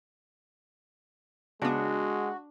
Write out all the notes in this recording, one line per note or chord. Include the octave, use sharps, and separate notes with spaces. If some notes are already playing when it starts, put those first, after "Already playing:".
C#3 G#3 B3 D4 F#4